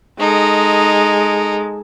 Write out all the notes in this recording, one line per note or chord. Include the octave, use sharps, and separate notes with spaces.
G#3 D#4 A4